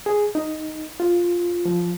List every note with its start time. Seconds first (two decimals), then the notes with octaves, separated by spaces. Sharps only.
0.06 G#4
0.35 D#4
1.00 F4
1.65 F3